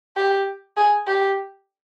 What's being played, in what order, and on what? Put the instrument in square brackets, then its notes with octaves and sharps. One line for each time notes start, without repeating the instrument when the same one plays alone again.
[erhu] G4
G#4
G4